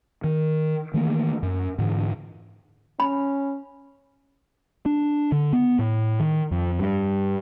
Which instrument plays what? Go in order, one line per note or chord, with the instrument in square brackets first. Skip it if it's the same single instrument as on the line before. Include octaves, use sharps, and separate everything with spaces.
[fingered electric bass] D#3
D#3 E3 A3 A#3
F#2
G#2 D3 E3
[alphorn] C#4 [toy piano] B5
[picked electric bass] D4
D3
B3
A2
D#3
F2
G2